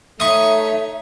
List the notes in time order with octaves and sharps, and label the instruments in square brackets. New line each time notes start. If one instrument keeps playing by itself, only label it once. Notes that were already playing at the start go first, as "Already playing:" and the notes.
[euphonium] A3 [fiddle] D#4 C#5 [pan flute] E5 [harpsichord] C#6 D#6